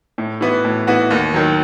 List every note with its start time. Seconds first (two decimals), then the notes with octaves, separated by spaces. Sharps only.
0.18 A2
0.41 E3 B3 F#4
0.65 A2
0.87 E3 B3 F#4
1.11 D#2
1.34 D#3 F#3